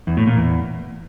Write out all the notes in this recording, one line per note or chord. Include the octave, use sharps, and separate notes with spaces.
E2
A2
A#2
E2